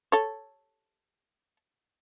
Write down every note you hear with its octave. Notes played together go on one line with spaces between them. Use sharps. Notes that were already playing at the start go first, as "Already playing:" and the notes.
A4 C#5